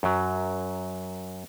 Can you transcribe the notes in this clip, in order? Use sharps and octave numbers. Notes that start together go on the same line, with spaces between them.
F#2 F#3